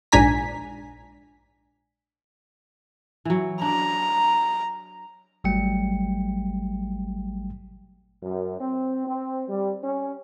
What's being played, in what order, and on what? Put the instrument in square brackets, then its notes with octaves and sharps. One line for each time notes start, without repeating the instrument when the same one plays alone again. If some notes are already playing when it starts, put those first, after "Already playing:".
[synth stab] A#1 G#2 D4 G#5 A#5 B6
[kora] E3 F#3
[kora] D4 [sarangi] A#5
[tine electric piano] G#1 F#3 G3 A3 G5 C#7
[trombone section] F#2
C4
C4
G3
C#4